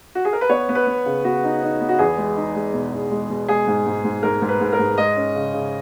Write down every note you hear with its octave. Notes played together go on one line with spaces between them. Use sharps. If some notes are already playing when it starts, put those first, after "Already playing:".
F#4
G#4
A#4
B4
B3 C#5
B3
B4
B3
C#3
B3 F#4
D#4
D#4
B3
F#4
E2 G#4
G#3
D#4
G#3
B2
E2
G#3
B2
G#3 G#4
G#2
G#2
G#2
G#2 A#4
G#2
B4
G#2
A#4
G#2
G#3 D#5
C#4
C#3
C#3